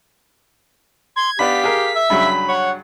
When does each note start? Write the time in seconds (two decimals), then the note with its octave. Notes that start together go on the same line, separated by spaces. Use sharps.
1.16 C6 G#6
1.39 B3 D4 G4 F5 B5 B6
1.64 G#4 A#4
1.95 E5
2.10 G2 C#3 F#3 B5
2.49 C#5 F#5